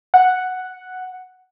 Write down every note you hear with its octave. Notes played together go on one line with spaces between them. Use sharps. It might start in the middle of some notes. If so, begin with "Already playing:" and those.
F#5